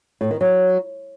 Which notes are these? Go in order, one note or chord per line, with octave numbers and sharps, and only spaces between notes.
A2
D#3
F#3